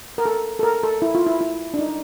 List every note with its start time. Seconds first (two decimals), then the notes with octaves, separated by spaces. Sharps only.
0.18 A#4
0.25 A4
0.59 A4
0.63 A#4
0.83 A4
1.02 E4
1.15 F4
1.26 E4
1.41 E4
1.74 D4
1.79 D#4